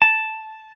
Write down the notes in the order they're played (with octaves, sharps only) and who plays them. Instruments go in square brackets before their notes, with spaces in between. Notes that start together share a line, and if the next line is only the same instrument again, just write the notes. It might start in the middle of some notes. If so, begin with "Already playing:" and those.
[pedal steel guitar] A5